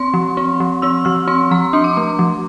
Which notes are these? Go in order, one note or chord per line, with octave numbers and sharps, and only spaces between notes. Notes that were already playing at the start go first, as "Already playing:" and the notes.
Already playing: C4 C6
F3
C4
F3
C4 E6
F3 F6
C4 C6
F3 A#5
D4 C6
D6
A3 C6
F3